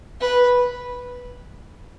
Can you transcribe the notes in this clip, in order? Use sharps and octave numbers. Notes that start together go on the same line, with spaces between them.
B4